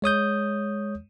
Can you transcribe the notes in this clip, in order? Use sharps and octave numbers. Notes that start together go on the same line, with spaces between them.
G#3 C#5 D#6 G6